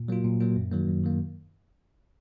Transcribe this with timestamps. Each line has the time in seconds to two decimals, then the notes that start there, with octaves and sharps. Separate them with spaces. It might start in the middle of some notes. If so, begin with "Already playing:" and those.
Already playing: A#2
0.08 F#3 A#3 F4
0.24 A#2
0.40 F#3 A#3 F4
0.56 F#2
0.72 D#3 F#3 A#3
0.87 F#2
1.04 D#3 F#3 A#3